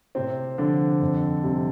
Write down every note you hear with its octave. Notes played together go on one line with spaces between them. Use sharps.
A2 C3 C4
D3 F3 D4
F2
C3 G3